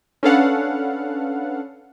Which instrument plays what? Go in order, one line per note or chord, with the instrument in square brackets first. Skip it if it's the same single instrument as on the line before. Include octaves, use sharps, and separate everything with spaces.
[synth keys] C#4 D4 A4 B4 F5 F#5